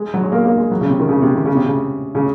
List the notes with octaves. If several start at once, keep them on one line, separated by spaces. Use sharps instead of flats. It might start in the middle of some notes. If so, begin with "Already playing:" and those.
Already playing: G#3
F#3
G#3
A#3
A#3
G#3
F#3
C#3
C3
D#3
C#3
C3
D#3
C#3
C3
C#3
C#3